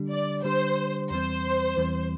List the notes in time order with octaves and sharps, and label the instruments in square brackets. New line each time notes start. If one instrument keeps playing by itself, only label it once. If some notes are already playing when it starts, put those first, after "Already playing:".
Already playing: [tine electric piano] D3 G3 D4 G4
[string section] D5
[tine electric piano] D3 G3 D4 G4 [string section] C5
[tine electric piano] E2 E3 G3 C4 [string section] C5
[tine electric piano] E2 E3 G3 C4